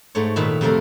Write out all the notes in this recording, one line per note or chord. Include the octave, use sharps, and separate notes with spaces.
G#2 A3 C#5
A#2 D#3 B4 E5 B5
F2 C3 A3 A#4 D5